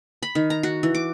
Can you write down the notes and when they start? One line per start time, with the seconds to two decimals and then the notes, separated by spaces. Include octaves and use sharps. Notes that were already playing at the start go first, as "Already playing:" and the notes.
0.23 B5
0.35 D#3
0.50 A#5
0.63 F#4
0.83 E3
0.95 D6